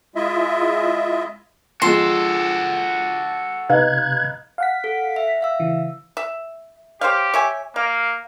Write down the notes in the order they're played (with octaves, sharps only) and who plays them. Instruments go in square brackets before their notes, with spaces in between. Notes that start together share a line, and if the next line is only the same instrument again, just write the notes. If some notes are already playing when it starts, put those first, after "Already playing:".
[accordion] G#3 E4 F4 D#5 E5
[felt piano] F3 G#3 [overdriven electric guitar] F#4 A4 [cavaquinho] C6
[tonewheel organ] C3 F#6 G#6 [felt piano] D#4 B4 F5
[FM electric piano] F5 F#5 B6
[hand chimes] A4
E5
E5 F5 E6
[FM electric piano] C#3 E3
[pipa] E5
[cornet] G4 [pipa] C5 C#5 F5
[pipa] C#5 E5 G#5
[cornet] A#3 [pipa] F5